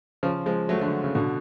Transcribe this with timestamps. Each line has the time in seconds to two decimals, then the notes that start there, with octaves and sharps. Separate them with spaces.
0.23 C#3 F3
0.46 F3 G#3
0.69 F#3 A3
0.80 D3 F#3
1.04 C#3
1.15 B2 D3